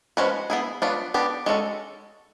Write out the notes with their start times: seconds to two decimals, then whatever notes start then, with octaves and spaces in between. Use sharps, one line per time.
0.17 F3 G#3 C#4 F#4 B4
0.50 B3 E4 G#4
0.82 F#3 B3 D4 F4
1.14 B3 D4 G4
1.46 G#3 C#4 F#4 A4